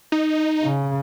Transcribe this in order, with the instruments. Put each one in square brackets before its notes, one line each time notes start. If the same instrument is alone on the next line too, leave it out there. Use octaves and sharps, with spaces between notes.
[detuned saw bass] D#4
[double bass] C#3